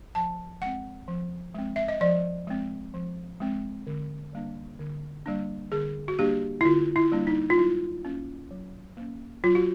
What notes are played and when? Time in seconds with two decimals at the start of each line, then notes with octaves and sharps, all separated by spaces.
0.15 F3 A5
0.61 G#3 C4 F#5
1.08 F3
1.54 G#3 C4
1.76 E5
1.88 D#5
2.01 F3 D5
2.47 G#3 C4
2.94 F3
3.40 G#3 C4
3.87 D3
4.33 G3 A#3 D4
4.79 D3
5.26 G3 A#3 D4
5.72 D3 G#4
6.08 F#4
6.19 G3 A#3 D4 G4
6.61 E4
6.65 D3 F4
6.96 E4
7.12 G3 A#3 D4
7.27 D#4
7.50 F4
7.58 F#3 E4
8.04 A#3 C#4
8.51 F#3
8.97 A#3 C#4
9.44 F#3 F4
9.55 F#4